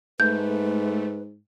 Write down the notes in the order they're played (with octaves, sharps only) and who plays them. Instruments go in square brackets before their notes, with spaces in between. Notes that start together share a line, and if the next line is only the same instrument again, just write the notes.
[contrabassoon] G#2 [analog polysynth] A3 [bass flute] B4 [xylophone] G6